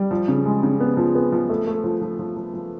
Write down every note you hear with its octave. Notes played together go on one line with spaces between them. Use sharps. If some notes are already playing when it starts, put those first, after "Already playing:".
Already playing: G3
F3
C#3
G#3
C#3
B3
F3
B3
F3
A3
A3
F3
F3
F3
F3
F3